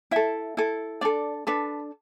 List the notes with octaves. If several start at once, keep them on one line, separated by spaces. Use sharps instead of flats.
E4 A4 E5
E4 A4
D4 A4 D5
D4 A4 B4